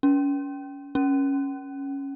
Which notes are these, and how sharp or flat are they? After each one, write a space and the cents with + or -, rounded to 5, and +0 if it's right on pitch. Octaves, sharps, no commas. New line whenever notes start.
C#4 +30
C#4 -5